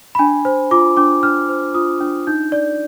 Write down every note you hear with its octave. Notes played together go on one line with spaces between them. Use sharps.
B5
D4 G#5
C5
F4 D6
D4 D6
D4 F6
C5
F4 D#6
D4
D#4 G6
D5